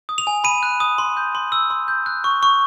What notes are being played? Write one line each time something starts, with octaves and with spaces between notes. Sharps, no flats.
D#6
F7
G#5
B5 D#7
F#6
D#6
C6
G6
C6
E6
C6
G6
F#6
C#6
C#6